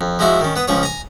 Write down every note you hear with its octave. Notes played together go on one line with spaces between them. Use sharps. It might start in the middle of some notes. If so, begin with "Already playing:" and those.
F2
F3 G#3 E4 F#4 E5
D#3 C#4
B3 B4 D#6
C#2 F3 C#4 G#4 C#5
G#5 A#5